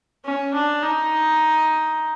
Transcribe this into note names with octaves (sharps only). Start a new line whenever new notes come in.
C#4
D4
D#4